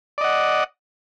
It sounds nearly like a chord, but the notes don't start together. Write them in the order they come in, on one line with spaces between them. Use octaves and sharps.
D5 D#5 F#5